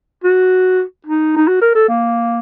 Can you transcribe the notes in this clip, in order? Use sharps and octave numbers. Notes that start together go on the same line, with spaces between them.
F#4
D#4
D#4
F#4
A#4
A4
A#3